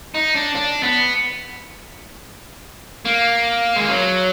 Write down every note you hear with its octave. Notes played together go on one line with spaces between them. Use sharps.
D#4
D4
D4
B3
A#3
G#3
F#3